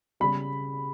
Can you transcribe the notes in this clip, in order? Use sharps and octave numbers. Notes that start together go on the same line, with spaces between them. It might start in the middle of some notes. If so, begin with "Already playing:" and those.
C#3 G3 B5